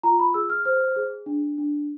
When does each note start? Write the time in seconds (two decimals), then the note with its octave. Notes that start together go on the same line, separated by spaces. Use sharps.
0.03 F4 A#5
0.19 B5
0.34 G#4 E6
0.50 F6
0.65 C5 F6
0.96 G#4
1.26 D4
1.58 D4